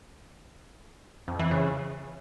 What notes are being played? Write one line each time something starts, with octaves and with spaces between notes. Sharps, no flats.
F2
E3
C#3